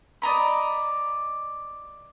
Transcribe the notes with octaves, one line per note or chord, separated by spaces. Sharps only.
D5 D#5 A#5 B5